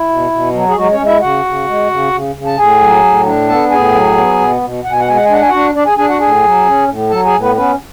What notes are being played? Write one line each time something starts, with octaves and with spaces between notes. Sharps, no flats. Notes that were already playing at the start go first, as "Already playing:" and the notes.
Already playing: E4
B2
B2
F#3
G#4
F#3 G#3 F#4
C#4 C#5
G#3
E4 E5
C#3 F#4 F#5
C#3
G#3
C#3
C#3
C#3
A5
A2 G#4 G#5
F#3
A2
D4
B3 A4 A5
A2 G#4 G#5
F#3
B3
B2
B2
B2 F#5
G#5
F#5
G#3 G#5
F#5
G#5
D4 F#5
G#5
D4 F#4 F#5
D4 D5
G#4 G#5
D4 G#4 G#5
F#4 F#5
A2 G#4 G#5
F#3
C#4
A2
F#3 A4 A5
G#4 G#5
A2
B3 B4
B3 C#4 B4